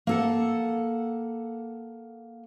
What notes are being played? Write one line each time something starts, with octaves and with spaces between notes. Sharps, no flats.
A#3 A4 F#5